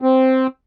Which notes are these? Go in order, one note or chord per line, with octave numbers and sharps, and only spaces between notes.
C4